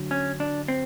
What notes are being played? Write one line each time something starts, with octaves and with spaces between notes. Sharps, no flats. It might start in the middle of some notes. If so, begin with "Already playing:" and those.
Already playing: D2 D3 F#3
C#4
D4
C4